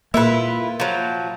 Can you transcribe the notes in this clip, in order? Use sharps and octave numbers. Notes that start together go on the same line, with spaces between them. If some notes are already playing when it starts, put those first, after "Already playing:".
A#2 A#3 E4 F4 B4 E6
F3 F#3